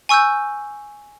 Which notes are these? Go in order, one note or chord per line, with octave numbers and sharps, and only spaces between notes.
G#5 C#6 E6 F#6 G6